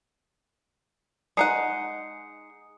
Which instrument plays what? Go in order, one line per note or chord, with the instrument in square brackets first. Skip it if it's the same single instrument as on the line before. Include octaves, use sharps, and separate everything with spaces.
[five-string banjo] G#3 D#4 F#5 [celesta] D#6 C7 C#7